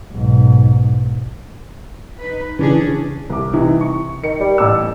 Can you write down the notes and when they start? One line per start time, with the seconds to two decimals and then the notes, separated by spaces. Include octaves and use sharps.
0.12 B1 G#2
2.19 D#4 B4
2.59 C#3 E3 C#4 D4 G#4
3.30 C2 D6
3.53 C3 E3 D#4
3.81 C#6
4.24 D#3 C#7
4.40 G3
4.58 A1 D6 E6